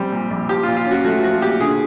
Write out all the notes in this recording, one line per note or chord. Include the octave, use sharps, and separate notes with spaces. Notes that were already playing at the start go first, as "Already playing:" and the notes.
Already playing: A#1 G3 C4
A#2
A#1
F3 G4
A#2 F4
F4
C#4 F#4
A3 F#4
F3 F#4
A#2 G4
D3 G#4